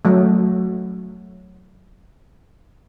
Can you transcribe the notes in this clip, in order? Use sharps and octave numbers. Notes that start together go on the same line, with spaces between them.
F#3 A3